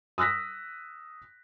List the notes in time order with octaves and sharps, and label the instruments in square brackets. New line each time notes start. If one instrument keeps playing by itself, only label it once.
[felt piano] D#6 E6 F#6 A#6 B6